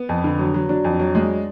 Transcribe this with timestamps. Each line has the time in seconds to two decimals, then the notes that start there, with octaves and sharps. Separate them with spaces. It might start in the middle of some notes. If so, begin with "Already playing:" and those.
Already playing: B3
0.09 F2
0.24 D3
0.39 F#3
0.54 F#3
0.69 F#3 D4
0.84 F2
1.00 F#3
1.15 G#3